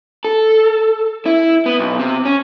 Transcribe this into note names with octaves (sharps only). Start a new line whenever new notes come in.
A4
E4
B3
B1
C3
C#4